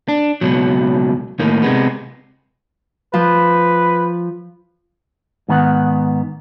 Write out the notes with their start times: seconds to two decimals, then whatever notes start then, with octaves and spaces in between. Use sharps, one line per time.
0.08 D4
0.41 C#2 B2 F#3
1.39 A2 D#3 A#3
1.62 C3 G#3 B3
3.14 F3 B4
5.49 G#2 D#3 B3 F#5